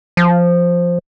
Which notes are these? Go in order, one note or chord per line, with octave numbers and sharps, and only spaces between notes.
F3